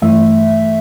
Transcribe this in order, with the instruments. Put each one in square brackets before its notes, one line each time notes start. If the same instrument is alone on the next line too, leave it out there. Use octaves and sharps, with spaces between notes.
[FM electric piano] G2 E3 A3 E5